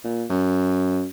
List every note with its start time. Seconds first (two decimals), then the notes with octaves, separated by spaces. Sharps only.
0.04 A#2
0.30 F#2